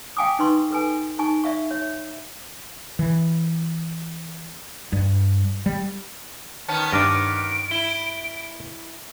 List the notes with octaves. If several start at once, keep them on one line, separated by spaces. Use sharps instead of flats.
F5 G5 G#5 D6 D#6
D#4 B4 C6 C#6
A4 B4 G#5
D#4 G#5 A5 C#6
D5 E5 F5 C#6
C#5 E5
E3
G2
G3
D#3 B3 C#4 A5
G2 D4 D6 F6 A#6 D7
E4 G7